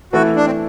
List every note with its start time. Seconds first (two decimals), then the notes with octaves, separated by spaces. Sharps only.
0.13 E3 A3 E4 F#4
0.36 D4
0.46 C4